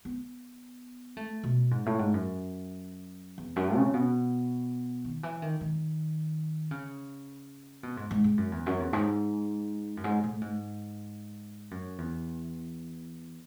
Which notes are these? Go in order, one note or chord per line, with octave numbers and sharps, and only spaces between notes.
B3
A3
B2
G#2
A2
G#2
F#2
E2
F#2
C#3
B2
D#3
E3
D#3
D#3
C#3
B2
G#2
G#2
G#2
F#2
E2
F#2
E2
G#2
F#2
G#2
A2
G#2
F#2
E2